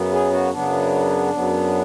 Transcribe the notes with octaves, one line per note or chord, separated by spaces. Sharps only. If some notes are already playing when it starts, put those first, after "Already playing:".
Already playing: F#2 C#3 F#3 B3
G#4
F#4
F#2 C#3 F#3 B3 D4
F#2 C#3 F#3 B3